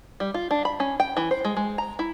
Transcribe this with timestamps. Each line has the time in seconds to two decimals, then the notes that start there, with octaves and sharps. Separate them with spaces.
0.20 G3
0.34 F4
0.51 D4
0.65 B5
0.80 C#4
1.00 G5
1.17 E3
1.31 C5
1.45 G#3
1.57 G#3
1.78 A#5
1.99 E4